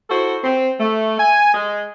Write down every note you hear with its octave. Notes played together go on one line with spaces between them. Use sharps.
E4 F#4 A4 C5
C4
A3
G#5
G#3